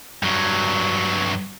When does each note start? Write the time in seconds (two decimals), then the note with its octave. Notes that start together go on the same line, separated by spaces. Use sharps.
0.23 G2 F#3